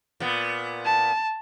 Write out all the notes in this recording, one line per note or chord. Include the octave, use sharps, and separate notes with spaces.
A#2 B3
A5